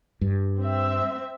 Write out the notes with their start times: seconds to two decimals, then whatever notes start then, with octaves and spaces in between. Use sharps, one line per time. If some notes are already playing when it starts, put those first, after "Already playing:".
0.21 G2
0.60 C4 E5